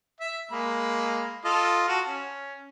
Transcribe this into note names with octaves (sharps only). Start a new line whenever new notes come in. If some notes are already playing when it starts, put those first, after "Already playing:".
E5
G#3 A#3 B5
F4 A4 D#5
F#4 A5
C#4